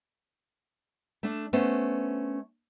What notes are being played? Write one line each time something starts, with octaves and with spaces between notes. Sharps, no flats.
A3 D4
A3 B3 C#4 D4 C5